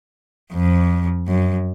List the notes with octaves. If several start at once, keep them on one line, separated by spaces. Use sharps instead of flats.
F2
F#2